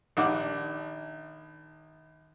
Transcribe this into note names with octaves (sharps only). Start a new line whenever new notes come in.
A#1 D#3 D4 G4 F#5 D6